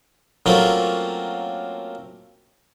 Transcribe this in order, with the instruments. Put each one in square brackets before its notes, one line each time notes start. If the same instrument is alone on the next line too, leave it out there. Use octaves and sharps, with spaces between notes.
[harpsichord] F#3 A3 A#3 C4 C#4 F4